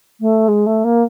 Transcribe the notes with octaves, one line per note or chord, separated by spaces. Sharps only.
A3
G#3
A3
A#3